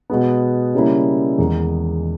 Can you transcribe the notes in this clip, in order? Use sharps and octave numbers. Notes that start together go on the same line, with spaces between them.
B2 G#3 B3
C#3 G3 A#3 E4
E2 D#3 G#3 D#4